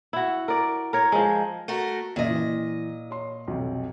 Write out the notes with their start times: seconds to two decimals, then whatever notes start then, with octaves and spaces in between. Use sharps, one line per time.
0.13 E4 F#4
0.48 A#4 D5
0.93 A#4 C#5
1.12 F3 G#3
1.68 A3 F#4 A#4
2.16 F#1 A#2 D#5 E5
2.29 E3
3.10 C#5 C6
3.48 B1 F2 C3